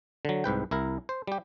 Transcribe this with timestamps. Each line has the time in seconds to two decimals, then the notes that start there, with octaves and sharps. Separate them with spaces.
0.25 D3 F#3
0.44 C2 G#2 B4 G5
0.71 C2 E4 A#4
1.09 C5
1.27 G3 G4